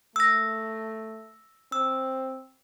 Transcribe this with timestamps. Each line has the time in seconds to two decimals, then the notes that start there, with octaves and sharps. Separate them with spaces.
0.16 A3 E6 A#6
1.72 C4 E6